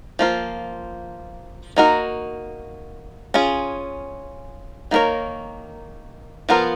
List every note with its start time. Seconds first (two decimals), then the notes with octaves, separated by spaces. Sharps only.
0.19 F3 A#3 F4
1.76 A#3 D#4 F#4 A#4
3.34 C#4 F4 G#4
4.91 D#3 A#3 D#4 A#4 C#5
6.49 F3 B3 F4 A#4